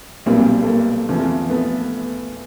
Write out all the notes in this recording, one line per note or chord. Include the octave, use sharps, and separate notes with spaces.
B1 A#2 G3 A#3 C4
A3
A#3
E2 C3 F3
A3 B3